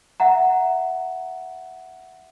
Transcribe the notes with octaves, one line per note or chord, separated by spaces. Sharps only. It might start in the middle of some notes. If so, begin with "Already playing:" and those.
E5 F#5 A#5